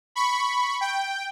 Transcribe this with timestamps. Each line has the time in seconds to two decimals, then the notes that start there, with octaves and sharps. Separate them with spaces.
0.16 B5 C#6
0.81 G5